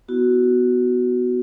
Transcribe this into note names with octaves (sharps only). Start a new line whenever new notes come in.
B3 E4 F#4